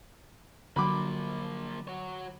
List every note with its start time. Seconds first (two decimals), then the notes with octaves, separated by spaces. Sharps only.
0.76 D3 F3 F#3 A#3 B5 D6
1.88 F#4 C#5